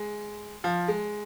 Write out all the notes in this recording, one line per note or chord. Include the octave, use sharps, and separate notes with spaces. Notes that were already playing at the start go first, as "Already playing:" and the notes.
Already playing: G#3
F3
G#3